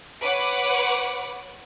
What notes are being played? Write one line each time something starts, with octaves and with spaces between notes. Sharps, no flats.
B4 C#5 F#5 D6